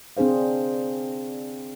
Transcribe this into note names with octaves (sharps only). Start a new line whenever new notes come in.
C4 D4 G#4 C5 F5